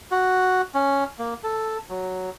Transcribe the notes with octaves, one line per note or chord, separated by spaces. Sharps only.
F#4
C#4
A#3
A4
F#3